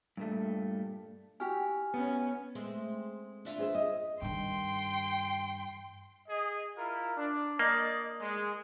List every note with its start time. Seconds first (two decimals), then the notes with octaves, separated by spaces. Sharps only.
0.17 G2 A#2 A3
1.40 E4 F#4 G4 G#5 F6
1.94 B3 C#4
2.55 G#3 A3 C4
3.45 D4 E4 F4
3.58 G#4 C5 E5
3.75 D#5
4.22 G2 D#3 G5 C6
6.28 G#4 D#5
6.77 E4 F4 A#4
7.16 D4
7.59 A#3 D5 D#5
8.19 G#3